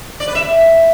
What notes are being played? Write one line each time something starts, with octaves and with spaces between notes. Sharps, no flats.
D5
B4
E5